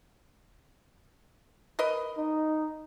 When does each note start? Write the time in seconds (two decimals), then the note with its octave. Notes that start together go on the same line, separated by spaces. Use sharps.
1.79 A#4 B4 D#5
2.17 D#4